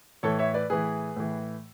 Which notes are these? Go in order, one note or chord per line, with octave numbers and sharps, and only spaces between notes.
A2 E3 A4 C#5
C#5 E5
B4 D5
A2 E3 G#4 B4
A2 E3